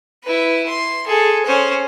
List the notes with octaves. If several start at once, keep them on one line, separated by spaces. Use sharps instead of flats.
E4 B4
C6
G#4 A4
C#4 C5